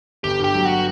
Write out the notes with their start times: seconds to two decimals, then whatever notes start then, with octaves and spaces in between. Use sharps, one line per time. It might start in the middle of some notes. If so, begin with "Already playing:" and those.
0.24 G1 G4
0.40 G2 G4
0.54 F#3
0.65 F#4